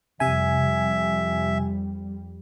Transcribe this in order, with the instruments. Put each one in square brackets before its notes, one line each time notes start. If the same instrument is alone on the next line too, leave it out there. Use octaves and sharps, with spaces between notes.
[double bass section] F2 G3 [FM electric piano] C3 G#5 [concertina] E5